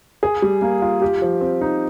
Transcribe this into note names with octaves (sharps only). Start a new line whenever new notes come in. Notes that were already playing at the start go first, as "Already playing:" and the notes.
G#4
G3
A#3
F4
G4
F3
C4
D#4